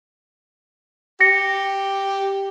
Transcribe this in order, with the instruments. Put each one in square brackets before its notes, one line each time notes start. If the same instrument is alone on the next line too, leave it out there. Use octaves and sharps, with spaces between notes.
[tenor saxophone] G4 [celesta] A#6 C#7